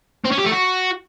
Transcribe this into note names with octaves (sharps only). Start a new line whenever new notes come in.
C4
C#4
G4
A3
F#4